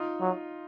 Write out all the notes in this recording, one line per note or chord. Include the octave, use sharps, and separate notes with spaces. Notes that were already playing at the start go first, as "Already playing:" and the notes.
Already playing: D#4 F4
F#3